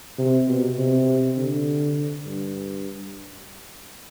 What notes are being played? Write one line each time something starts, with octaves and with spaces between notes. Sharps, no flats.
C3
B2
C3
D3
G2